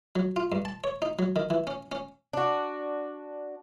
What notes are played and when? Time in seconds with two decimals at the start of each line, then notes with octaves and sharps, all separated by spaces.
0.16 F#3
0.36 F4
0.52 G2
0.65 A5
0.84 C#5
1.02 D#4
1.19 F#3
1.36 D#3
1.50 E3
1.67 C#4
1.92 C#4
2.33 D4 F#4